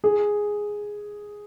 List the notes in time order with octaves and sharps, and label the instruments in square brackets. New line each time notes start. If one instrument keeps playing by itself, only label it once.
[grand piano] G#4